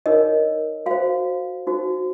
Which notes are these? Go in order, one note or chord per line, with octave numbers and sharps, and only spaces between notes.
D#4 A#4 C#5 D#5
F#4 C5 F5
D#4 F#4 C5